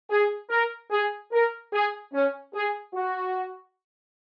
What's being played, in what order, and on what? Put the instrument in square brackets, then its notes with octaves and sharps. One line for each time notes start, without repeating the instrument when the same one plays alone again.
[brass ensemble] G#4
A#4
G#4
A#4
G#4
C#4
G#4
F#4